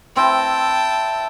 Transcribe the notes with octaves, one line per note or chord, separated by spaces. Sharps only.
C4 E4 G5 A5